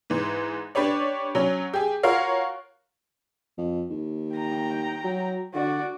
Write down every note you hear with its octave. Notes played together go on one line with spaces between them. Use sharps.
G#2 E3
D4 G4 B4 C#5 D5
F#3 C#4
G4 G#4
F4 F#4 A#4 C#5 F5
F2
D#2
G5 A#5
F#3
D3 F#4 D5